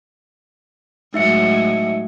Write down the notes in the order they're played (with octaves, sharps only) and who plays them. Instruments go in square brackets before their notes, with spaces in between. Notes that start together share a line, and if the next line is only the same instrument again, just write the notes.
[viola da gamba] A2 F#3 G#3 [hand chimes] D#4 E5 C#7